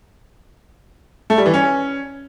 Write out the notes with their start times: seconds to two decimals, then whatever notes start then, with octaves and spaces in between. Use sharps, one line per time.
1.30 A3
1.38 G3
1.46 E3
1.54 C#4